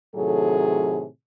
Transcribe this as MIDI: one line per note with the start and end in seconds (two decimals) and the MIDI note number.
0.15 1.05 45
0.15 1.05 48
0.15 1.05 51
0.15 1.05 54
0.15 1.05 68
0.15 1.05 69